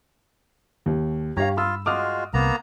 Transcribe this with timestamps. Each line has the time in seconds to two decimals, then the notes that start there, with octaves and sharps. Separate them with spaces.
0.86 D#2
1.37 G2 G4 C#5 F5 A#5
1.57 F4 B5 D#6 E6
1.86 G#3 F4 F#4 D6 D#6 F6
2.34 C2 C3 A#3 B3 A#5